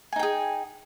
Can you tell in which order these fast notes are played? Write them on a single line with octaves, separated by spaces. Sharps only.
G#5 D#4 G5 G#4